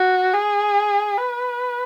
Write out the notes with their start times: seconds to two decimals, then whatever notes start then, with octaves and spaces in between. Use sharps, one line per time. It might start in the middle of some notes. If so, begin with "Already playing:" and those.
Already playing: F#4
0.34 G#4
1.18 B4